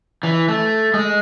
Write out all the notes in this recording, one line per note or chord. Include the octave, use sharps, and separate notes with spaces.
E3
A3
G#3